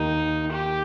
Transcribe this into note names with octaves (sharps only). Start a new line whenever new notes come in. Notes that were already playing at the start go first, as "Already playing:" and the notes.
Already playing: D#2 D#3 A#3 D#4
G4